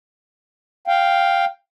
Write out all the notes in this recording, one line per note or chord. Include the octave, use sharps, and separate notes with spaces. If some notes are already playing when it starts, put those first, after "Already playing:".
F5 G5